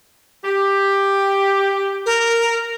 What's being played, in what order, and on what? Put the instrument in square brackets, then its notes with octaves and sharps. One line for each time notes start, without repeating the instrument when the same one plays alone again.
[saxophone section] G4
[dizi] A#4